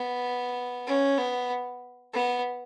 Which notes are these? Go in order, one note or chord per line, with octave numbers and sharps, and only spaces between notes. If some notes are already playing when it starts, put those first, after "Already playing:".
Already playing: B3
C#4
B3
B3